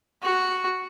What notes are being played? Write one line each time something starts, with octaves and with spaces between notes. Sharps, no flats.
F#4 C#6